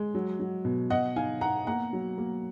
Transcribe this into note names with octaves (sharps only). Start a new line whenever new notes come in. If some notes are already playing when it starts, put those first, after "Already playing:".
Already playing: G#3
F#3
F#3
B2
B2 D#5 F#5
D#4 F5 G#5
B3 F#5 A#5
A#3 F#5 A#5
F#3
A#3